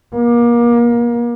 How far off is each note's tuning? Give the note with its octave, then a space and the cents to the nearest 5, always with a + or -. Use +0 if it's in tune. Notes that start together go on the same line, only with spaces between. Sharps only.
A#3 +30